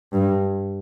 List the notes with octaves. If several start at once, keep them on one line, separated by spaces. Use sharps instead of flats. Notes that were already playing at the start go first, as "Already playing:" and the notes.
G2